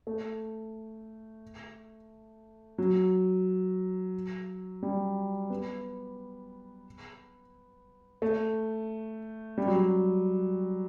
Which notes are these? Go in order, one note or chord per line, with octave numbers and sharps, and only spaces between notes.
A3
F#3
G3
B3
A3
G3
F#3
G3